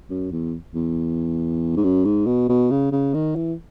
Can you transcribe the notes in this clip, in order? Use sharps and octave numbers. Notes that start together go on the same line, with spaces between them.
F#2
E2
E2
G#2
F#2
G#2
B2
B2
C#3
C#3
D#3
E3